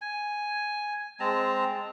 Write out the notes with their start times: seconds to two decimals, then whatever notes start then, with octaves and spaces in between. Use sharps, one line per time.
0.02 G#5
1.20 G#3 C4 A5 A#5